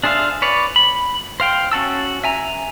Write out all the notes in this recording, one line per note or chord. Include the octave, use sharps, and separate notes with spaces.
D4 G#4 C5 E5 F5
B4 C#5 D5
B5
C5 F5 G5
C#4 F#4 A5 E6
E5 G#5 A#5